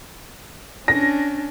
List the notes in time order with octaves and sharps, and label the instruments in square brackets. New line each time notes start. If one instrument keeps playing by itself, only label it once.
[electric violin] C#4 D4 [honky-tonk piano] A#6